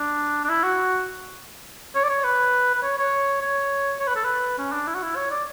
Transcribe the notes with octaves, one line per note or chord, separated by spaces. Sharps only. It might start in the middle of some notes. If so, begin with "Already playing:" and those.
Already playing: D4
D4
E4
F#4
C#5
D5
C#5
B4
B4
C#5
C#5
C#5
C#5
B4
A4
B4
C#4
D4
E4
F#4
E4
C#5
D5